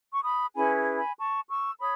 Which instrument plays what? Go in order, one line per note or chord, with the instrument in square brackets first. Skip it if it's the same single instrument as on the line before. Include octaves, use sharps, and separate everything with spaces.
[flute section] C#6
B5 D#6
C#4 E4 G#4 B4 G#5 B5
G#5 B5
A5 C#6
C#6 E6
C#5 B5 D#6